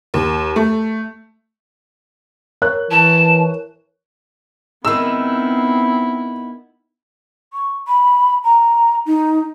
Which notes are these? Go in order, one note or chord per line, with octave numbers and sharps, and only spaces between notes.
D#2
A3
A#4 C#5 F#6
E3 A5
D#3 G#3 B3 C4 E4 E6
C#6
B5
A#5
D#4